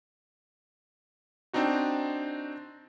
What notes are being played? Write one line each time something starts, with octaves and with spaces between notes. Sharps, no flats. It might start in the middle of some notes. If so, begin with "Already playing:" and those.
C4 D4 D#4 F#4